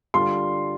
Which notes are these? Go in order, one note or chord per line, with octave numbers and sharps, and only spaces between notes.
D3 G3 D4 F4 C6